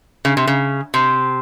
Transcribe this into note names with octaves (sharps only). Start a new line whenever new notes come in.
C#3
C3
C#3
C3